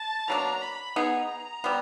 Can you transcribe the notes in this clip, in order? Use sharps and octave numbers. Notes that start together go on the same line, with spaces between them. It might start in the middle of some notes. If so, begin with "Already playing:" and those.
Already playing: A5
B2 F#3 A#3 D4 A#5
B5
B3 D#4 G#4 A#5
G3 B3